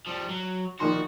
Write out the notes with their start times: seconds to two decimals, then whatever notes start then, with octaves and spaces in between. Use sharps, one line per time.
0.07 F3 G3
0.29 F#3
0.80 A#1 D#3 F#4 C6